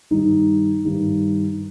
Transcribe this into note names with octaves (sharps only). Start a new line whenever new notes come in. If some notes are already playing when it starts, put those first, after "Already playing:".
G2 D#3 G3 D#4
G2 D#3 G3